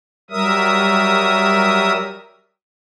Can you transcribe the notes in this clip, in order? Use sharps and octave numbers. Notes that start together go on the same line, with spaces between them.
F#3 G3 A#4 E5 D#6